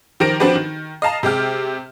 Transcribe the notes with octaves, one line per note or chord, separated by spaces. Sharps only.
D#3 F3 G4 A#4 A#6 D7
F3 C4 D4 F#4 G4 B4
D#3
D#5 F5 A5 A#5
C3 G#3 G4 F6